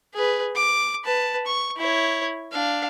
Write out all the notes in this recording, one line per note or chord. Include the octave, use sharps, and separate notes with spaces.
G#4 B4
D6
B4 A5
C#6
E4 C#5
D4 F5